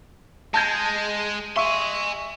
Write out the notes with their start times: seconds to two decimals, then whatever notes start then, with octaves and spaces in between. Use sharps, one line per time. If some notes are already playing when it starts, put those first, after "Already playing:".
0.54 G#3 A5 G6 G#6
1.56 E5 G#5 C6 C#6